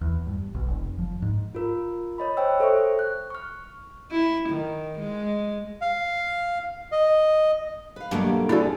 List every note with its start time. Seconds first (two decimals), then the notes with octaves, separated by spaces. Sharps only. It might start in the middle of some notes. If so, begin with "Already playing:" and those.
0.01 E2
0.27 G2
0.55 B1
0.68 F1
0.99 F3
1.22 G#2
1.55 F4 A#4
2.18 C#5 D#5 B5
2.37 C5 C#5 G5 E6
2.60 A4 C5 E5 C#6
2.99 F#6
3.30 C#6 F6
4.11 E4
4.49 D#3
4.99 G#3
5.81 F5
6.92 D#5
7.96 B4 F5
8.11 G2 B2 F#3 G3 A3 A#3
8.49 C3 F3 G3 E4 F#4 G#4 A4 D5